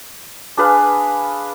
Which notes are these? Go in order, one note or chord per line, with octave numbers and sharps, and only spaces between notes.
D4 G#4 B4 F5